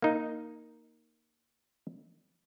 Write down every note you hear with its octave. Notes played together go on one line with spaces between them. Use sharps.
A#3 D#4